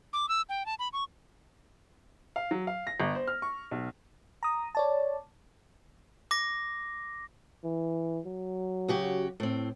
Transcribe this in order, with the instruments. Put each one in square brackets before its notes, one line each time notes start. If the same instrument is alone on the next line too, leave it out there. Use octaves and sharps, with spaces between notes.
[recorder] D6
E6
G5
A5
B5
C#6
[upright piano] F5
F#3
F5
A#6
G1
C5
F6
C#6
B1
[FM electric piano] A#5 D#6
C#5 D5 A5
[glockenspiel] D6 A#6
[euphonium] E3
F#3
[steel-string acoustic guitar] C#3 F#4 G4
A2 C4